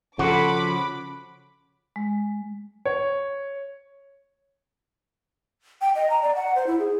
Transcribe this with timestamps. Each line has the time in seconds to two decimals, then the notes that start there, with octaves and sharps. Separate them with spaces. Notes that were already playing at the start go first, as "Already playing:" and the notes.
0.19 C#3 F3 F#4 A4 F#5 B5 D6
1.96 G#3
2.85 C#5
5.81 G5
5.95 D#5
6.10 A#5
6.22 D5
6.35 F#5
6.55 C5
6.67 E4
6.79 G#4